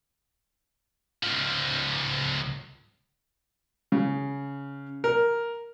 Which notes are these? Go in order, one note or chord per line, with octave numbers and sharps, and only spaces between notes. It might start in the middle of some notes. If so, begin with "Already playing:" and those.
C#2 F3
C#3
A#4